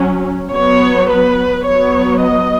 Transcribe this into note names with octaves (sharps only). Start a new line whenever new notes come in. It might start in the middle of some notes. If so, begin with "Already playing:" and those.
Already playing: F#3 C#4
F#3 B3 C#5
B4
B3 C#5
F#3
D#5